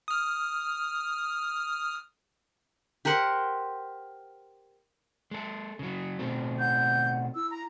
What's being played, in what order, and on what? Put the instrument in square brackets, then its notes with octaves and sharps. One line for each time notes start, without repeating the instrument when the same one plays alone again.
[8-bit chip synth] D#6 F6
[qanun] G4 A#4 C5 F#5
[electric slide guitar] G#3 A4
C#3 F#3
B2 A3 C4
[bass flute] F#5 [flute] G6
[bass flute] E4 [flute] E6
[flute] A#5